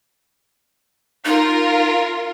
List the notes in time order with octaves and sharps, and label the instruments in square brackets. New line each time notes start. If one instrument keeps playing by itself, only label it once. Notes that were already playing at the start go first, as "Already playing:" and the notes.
[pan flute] D#4 [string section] F4 A#4